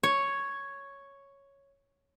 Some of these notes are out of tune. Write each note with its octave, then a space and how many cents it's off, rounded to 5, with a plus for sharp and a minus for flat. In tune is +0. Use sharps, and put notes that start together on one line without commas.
C#5 +0